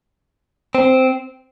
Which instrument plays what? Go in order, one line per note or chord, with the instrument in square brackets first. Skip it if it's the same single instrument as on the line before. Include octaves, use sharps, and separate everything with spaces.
[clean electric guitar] C4